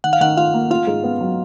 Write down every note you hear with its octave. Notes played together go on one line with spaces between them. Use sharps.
D#3 F#5
F5
D#3 F#5
F4 F5
A#3
F4 F5
G#2
B3
F#3